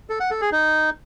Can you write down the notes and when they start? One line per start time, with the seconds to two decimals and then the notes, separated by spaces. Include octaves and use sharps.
0.10 A4
0.20 F#5
0.31 A4
0.41 G#4
0.52 D#4